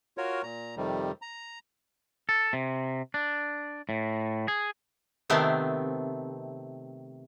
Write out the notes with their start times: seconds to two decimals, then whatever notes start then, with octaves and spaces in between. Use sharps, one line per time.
0.18 F4 F#4 A#4 C#5
0.43 A#2 A#5
0.77 F2 C3 D#3 G3
1.22 A#5
2.29 A4
2.53 C3
3.14 D4
3.89 A2
4.48 G#4
5.30 C3 D#3 A3 B3 C4